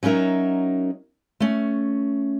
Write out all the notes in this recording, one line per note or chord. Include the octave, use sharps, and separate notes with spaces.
F#3 C#4 D#4 A#4 E5
A3 C#4